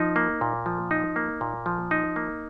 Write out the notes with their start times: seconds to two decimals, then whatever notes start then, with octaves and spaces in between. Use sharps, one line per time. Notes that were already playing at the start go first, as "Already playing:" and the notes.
Already playing: F3 D#4
0.16 A#3
0.41 A#2
0.66 F3
0.91 D#4
1.16 A#3
1.41 A#2
1.66 F3
1.91 D#4
2.16 A#3